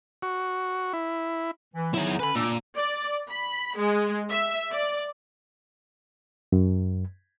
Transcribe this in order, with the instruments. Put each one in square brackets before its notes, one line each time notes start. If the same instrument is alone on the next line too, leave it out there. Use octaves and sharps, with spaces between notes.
[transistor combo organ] F#4
E4
[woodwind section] E3
[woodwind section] F#3 B3 D#4 [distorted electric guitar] E4 G#4
[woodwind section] D3 C#4 [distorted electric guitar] B4 B5
[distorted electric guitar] A#2 [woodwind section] D4 D6 E6
[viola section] D5
B5
G#3
E5
D5
[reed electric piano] F#2